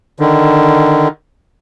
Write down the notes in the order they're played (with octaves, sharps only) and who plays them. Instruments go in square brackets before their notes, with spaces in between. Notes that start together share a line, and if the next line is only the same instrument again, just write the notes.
[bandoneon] D3 D#3